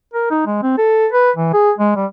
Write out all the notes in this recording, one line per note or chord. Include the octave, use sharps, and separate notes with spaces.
A#4
D#4
G#3
C4
A4
B4
E3
G#4
G#3
G3